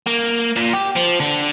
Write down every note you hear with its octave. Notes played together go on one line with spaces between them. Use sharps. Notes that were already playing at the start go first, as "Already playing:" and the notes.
A#3
A#2
G4
F3
D3